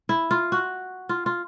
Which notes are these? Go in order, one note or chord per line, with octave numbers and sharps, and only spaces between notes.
E4
F4
F#4
F4
F4